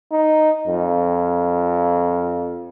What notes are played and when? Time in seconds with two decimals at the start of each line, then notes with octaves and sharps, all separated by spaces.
0.12 D#4
0.67 F2